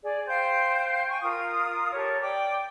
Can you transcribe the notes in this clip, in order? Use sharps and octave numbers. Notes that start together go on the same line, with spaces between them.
G#4 D5
C5 F5 G5 G6
G5 G#5 C#6
F4 A#4 D#6
G4 A4 A#4 C#5
D5 G5 D6